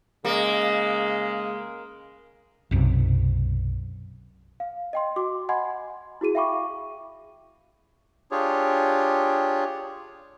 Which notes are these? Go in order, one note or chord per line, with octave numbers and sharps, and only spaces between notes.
C#3 G#3 A#3
B1 F#2 C3
F5
D#5 G5 C6
F#4 C6 D6
D#5 F#5 G#5 B5 C6 G#6
E4 F#4 G#4 D#7
E5 F5 G5 B5 C#6 D6
D4 F4 G4 G#4 C#5